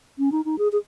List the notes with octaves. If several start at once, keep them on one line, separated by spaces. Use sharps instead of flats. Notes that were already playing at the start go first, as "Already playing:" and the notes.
C#4
D#4
D#4
G#4
G#4